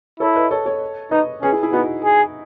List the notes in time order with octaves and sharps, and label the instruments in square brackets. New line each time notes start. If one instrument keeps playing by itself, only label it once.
[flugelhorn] E4 [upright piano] A4 C#5
[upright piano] B4 D#5
A4 C#5
A4 C#5
[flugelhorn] D#4 [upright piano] B4 D#5
[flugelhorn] C#4 [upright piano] G#4 B4
[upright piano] E4 G#4
E4 G#4
[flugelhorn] B3 [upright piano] D#4 F#4
[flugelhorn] G#4